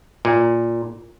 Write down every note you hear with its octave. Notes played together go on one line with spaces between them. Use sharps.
A#2